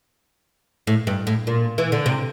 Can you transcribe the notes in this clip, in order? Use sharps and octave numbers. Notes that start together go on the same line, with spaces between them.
A2
G2
A2
A#2
E3
D3
C3